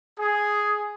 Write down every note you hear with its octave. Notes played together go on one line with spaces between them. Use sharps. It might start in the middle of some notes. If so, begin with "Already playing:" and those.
G#4